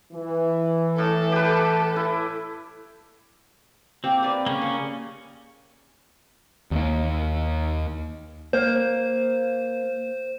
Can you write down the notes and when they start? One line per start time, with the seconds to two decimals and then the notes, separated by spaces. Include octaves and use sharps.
0.13 E3
0.98 A2 A4
1.32 G4 B4
1.96 E4
4.04 A#3 C4 G4
4.23 B4 D5
4.46 C#3 A#3 C#4
4.62 C#5
6.71 D#2 A#3
8.53 A#3 C5